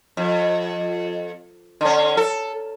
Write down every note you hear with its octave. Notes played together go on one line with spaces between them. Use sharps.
F2
D3 C#4
A4